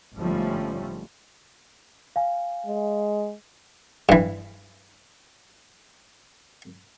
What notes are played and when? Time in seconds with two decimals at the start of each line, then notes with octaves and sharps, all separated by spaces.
0.17 G1 G#2 F3 G3 A3 C#4
2.16 F5 G#5
2.66 G#3
4.09 G2 E3